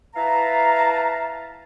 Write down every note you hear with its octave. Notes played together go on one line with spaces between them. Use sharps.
E4 B4 F5 A5 A#5